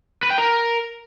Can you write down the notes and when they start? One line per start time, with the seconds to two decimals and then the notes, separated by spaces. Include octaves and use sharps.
0.23 B4
0.30 G5
0.38 A#4